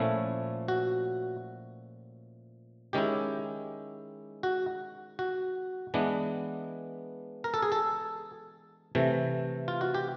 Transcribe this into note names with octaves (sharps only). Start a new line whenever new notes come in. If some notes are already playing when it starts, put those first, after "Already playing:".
Already playing: A#2 F3 A3 C#4 E4
F#4
D#3 G#3 C#4 E4 G4
F#4
F#4
E3 G#3 B3 D4
A#4
A4
G#4
A4
C3 E3 A3
F4
F#4
G4